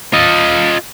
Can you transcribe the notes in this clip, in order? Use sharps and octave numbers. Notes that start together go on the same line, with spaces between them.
F4 D#5